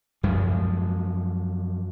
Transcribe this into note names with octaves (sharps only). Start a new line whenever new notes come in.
F#2 F3 G#3